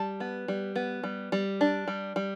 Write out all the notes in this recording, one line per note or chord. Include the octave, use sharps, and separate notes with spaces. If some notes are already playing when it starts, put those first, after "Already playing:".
Already playing: G3 A5
B3
G3
B3
G3
G3
D4
G3
G3